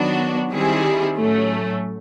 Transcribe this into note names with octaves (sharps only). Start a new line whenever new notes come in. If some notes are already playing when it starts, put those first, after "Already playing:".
Already playing: D#3 F#3 B3 D4 F#4
D#3 G3 C4 E4 G#4
A2 F#3 A3 C#4